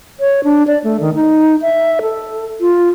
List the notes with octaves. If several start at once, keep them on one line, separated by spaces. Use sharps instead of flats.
C#5
D4
D5
A3
D#3
D#4
E5
A4
F4